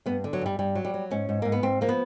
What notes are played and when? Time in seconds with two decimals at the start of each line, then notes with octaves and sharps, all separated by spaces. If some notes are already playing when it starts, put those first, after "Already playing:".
0.06 G2 B3
0.24 D3
0.33 F#3
0.41 G2 G3
0.59 G2 G3
0.75 F#3
0.85 G3
0.94 F#3
1.11 G#2 C#4
1.29 G#2
1.42 G#2 A#3
1.52 B3
1.62 G#2 C4
1.81 F3 A#3
1.89 B3